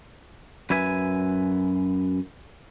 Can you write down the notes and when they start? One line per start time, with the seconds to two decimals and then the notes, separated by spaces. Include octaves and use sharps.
0.70 F#2 B4 E5 G#5